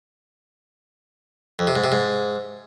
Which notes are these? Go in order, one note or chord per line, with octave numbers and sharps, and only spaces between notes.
F2
C3
G#2
C3
G#2